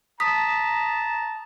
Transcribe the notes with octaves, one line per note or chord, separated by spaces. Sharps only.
A5 A#5 D#6 B6